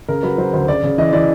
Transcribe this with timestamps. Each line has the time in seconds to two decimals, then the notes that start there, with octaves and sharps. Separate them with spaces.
0.08 C#3 A#4
0.23 F#3 B4
0.38 F#3 C5
0.53 D2 C5
0.68 C#3 D5
0.83 C#3
0.98 E3 D#5
1.13 E3 D5